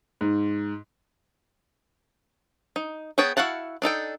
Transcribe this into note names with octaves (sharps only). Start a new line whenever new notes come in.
G#2
D#4
B3 G#4 C#5 G5 A5
E4 F#4 F5 F#5 A5
D4 D#4 A4 G5